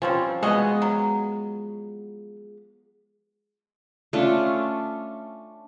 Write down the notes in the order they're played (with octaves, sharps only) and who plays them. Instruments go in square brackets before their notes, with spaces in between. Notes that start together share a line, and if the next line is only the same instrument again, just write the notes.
[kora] F3 [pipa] G3 C4 C#4
[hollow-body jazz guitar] G#3 B3 [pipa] F#4 G#4 D#5
[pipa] F#3
[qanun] A3 C#4 D4 F4